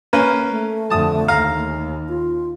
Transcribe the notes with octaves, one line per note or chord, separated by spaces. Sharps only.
A#3 C#4 B4
A3
F2 D3 A5 D#6
D#2 F5 A#5
F4